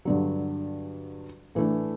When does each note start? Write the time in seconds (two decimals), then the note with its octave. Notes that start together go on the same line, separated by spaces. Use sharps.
0.05 G2 D3 F#3
1.55 A2 E3 A3 D4